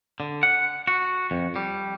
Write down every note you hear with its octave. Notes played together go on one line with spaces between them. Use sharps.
D3
F#5
F#4
F2
G3